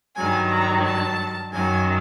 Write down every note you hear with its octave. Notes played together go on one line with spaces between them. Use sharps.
G2 D#3 F#3 G#5
A#5
A5
F#2 D#3 F#3 G#5